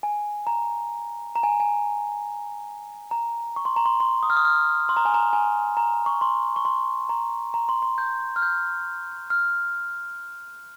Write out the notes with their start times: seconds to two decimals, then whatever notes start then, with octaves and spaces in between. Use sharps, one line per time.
0.03 G#5
0.47 A#5
1.36 A#5
1.43 G#5
1.60 G#5
3.11 A#5
3.56 C#6
3.65 C6
3.76 A#5
3.86 C6
4.00 C6
4.23 D#6
4.30 F6
4.36 D#6
4.45 F6
4.89 C6
4.97 A#5
5.05 G#5
5.14 A#5
5.33 G#5
5.77 A#5
6.06 C#6
6.21 C6
6.56 C#6
6.65 C6
7.09 A#5
7.54 A#5
7.69 C6
7.82 C6
7.98 G6
8.36 F6
8.42 G6
9.30 F6